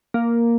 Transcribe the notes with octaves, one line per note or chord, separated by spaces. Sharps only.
A#3